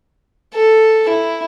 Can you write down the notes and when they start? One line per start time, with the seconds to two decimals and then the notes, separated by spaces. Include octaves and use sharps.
0.53 A4
1.08 E4